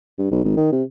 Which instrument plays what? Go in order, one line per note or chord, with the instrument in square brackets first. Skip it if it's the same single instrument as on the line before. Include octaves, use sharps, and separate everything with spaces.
[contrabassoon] G2
B1
G#1
D#3
C3